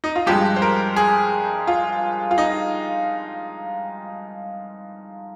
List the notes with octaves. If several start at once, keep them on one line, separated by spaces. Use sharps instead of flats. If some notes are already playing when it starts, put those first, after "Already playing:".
D#4
F4
G2 F3 G#3 G4
C5
A#4
G#4
F4
F4
D#4